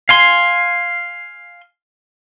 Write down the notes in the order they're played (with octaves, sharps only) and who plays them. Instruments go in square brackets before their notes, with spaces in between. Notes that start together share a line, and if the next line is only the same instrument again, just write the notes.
[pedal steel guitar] F5 G#5 C6